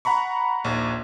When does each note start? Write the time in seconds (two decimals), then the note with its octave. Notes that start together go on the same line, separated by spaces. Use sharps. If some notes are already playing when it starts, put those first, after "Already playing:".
0.05 F#5 A#5 B5 C#6
0.64 A#1 D#2